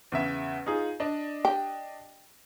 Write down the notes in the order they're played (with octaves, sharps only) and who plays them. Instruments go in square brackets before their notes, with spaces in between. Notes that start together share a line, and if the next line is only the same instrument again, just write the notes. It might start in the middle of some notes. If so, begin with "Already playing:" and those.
[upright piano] E2 C#3 E5
D#4 F4 G#4
D4 D5 D#5
[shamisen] G4